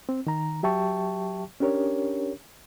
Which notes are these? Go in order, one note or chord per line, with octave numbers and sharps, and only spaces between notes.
C4
D#3 A#5
F#3 G4 E5 G5 A5 C#6
C#4 D4 G4 A#4 C#5